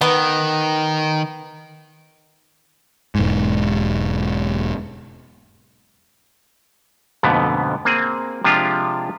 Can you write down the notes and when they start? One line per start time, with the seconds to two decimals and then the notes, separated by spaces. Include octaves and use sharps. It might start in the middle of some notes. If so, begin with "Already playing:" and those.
0.01 D#3 B3
3.15 E1 G#2
7.23 F2 G#2 B2 D3 A3 B3
7.85 A#3 C4 G#4
8.44 C3 F3 G#3 D4 F4 G4